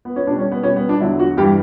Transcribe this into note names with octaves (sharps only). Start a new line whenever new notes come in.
B3
C#4
B2 G3 D4
C#4
B3
B2 G3 C#4
B3
D4
E2 D3 F#3 E4
F#4
G2 E3 G3 G4